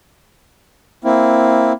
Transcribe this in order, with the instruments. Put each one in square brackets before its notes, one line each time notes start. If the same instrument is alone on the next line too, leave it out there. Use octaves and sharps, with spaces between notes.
[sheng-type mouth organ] A#3 C4 E4